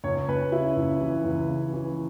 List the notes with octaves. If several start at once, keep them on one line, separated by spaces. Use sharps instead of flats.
C#2 C#5
C#2 B4
C#3 E4
C#2
E3
C#2
C#3
E3